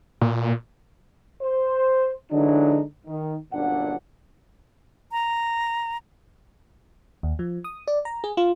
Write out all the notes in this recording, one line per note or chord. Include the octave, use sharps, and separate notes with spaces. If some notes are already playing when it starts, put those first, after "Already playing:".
A#2
C5
D3 E3 F#3 G#3 D4 D#4
D#3
G1 F#2 A#2 D4 F#5
A#5
D#2
F3
D#6
D5
A#5
G#4
F4